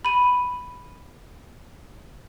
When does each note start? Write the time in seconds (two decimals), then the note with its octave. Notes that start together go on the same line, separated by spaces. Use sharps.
0.05 B5 D#7